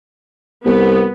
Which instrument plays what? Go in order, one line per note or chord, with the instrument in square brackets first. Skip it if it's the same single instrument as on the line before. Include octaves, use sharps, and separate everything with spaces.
[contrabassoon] C2 [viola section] B3